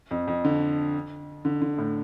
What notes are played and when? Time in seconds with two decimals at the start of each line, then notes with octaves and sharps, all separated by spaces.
0.11 F2
0.28 F2
0.45 D3
1.45 D3
1.62 D3
1.78 A2